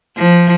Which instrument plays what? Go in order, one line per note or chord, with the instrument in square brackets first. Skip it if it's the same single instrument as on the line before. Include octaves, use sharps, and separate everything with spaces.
[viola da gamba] F3